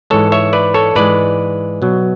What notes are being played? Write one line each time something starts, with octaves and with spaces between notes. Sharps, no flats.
G#2 E3 G#3 A4 C#5
C#5 E5
B4 D5
A4 C#5
G#2 E3 G#3 B4 D5
B2 F#3